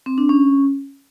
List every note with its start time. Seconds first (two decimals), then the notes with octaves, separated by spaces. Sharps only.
0.06 C4
0.18 D4
0.29 C#4